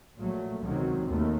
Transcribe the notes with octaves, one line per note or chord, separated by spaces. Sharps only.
A#1 A#2 F#3 A3
C#2 C3 D#3 F#3
D#2 D#3 A3